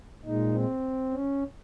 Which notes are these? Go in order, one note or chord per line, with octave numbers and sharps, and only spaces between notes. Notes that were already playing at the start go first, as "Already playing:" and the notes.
A#2 G#3 D#4
C4
C#4